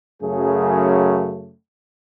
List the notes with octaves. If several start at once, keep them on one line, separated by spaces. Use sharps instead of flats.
F#2 C#3 F#3 A3 G#4